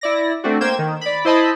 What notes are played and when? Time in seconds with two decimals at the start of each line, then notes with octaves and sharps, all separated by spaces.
0.01 E4 D5 A#6
0.44 A3 C4 D4 F#4
0.61 A#3 C5 G5 G#6 E7
0.79 D#3
1.01 D5 B5
1.25 E4 C5 D#5 A5 B5